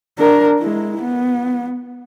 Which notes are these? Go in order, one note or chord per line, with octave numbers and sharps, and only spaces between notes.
D4 A#4
G#3 E4
B3